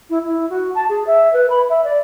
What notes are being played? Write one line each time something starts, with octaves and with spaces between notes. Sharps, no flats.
E4
E4
F#4
A5
G#4
E5
B4
B5
E5
D5